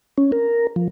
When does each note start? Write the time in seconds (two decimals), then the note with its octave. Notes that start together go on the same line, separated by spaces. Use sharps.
0.18 C#4
0.32 A#4
0.76 F3